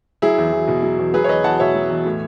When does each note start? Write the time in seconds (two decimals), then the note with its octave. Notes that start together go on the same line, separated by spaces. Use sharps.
0.22 F#3 E4 G#4
0.38 E2
0.52 E2
0.68 B2
0.83 F#3
0.98 E2
1.13 F#3 G#4 B4
1.24 C#5
1.29 E2 B4 D#5
1.44 E2 F#5 A5
1.60 B2 C#5 E5
1.74 F#3
1.90 E2
2.05 A2